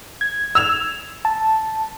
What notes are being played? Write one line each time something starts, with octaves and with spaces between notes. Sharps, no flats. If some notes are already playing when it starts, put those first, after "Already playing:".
G#6
E6 F7
A5